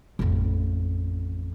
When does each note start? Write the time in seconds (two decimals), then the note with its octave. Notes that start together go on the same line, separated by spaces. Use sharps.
0.19 A1 F2